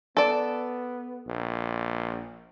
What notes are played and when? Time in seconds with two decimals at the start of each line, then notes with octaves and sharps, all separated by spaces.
0.17 B3 A4 D5
1.27 A#1